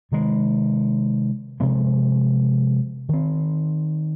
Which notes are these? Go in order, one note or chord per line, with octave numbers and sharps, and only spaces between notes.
C3 D#3 G#3
C3 F3 G#3 C4
D#3 C4